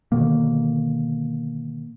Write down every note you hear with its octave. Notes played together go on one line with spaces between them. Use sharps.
B2 D3 D#3 A#3